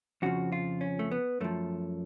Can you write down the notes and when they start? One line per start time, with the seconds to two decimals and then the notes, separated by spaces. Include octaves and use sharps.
0.22 F2 C#3 F3 F#4
0.52 F4
0.81 C#4
0.99 A3
1.11 B3
1.41 F#2 F3 A3